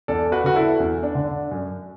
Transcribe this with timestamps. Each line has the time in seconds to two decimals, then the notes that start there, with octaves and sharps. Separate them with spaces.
0.08 E2 A4 D5
0.32 F#4 B4
0.44 D3 F#4
0.56 E4 A4
0.80 E2
1.03 D4
1.15 D3
1.27 D4
1.51 F#2